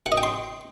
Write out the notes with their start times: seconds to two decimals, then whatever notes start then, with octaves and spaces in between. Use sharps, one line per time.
0.06 F#5
0.12 D#5
0.17 G5
0.23 C6